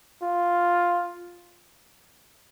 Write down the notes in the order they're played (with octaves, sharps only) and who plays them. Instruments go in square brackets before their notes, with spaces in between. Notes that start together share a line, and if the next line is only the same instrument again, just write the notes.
[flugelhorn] F4